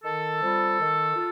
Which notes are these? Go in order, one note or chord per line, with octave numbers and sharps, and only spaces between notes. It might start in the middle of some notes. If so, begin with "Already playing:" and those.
D#3 A4
G3 C4 F4
D#3
F4